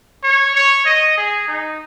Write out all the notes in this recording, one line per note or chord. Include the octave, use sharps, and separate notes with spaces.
C#5
C#5
D#5
G#4
D#4